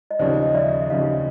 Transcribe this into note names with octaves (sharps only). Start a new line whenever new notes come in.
D#5
D#2 C#3 F3 C5 D5
D#5
D5 E5
E5
D#2 C#3 F3 D#5 F5